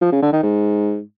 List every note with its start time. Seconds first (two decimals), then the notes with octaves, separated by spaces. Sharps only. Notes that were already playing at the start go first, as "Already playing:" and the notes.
0.02 F3
0.12 C#3
0.22 D3
0.33 D#3
0.43 G#2